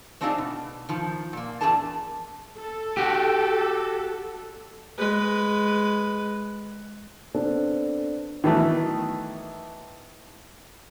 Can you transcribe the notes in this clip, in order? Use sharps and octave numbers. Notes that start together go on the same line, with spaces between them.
A3 C4 D4 D#4 F4 G#4
B2
D#3 F3
A#2 A#3
E2 E3 D4 G#4 A#4 A5
A4
F#4 G4
G#3 B4
B3 C4 D4 A4 C5
D#3 E3 F#3 A3 B3